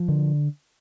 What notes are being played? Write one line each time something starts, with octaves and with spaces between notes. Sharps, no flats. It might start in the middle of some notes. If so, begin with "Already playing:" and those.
Already playing: F3
D3